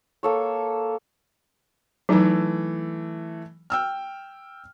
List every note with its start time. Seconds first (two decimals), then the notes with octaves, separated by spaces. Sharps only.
0.23 A#3 A4 C#5
2.09 E3 F#3 A3 D#4
3.70 G5 E6 F6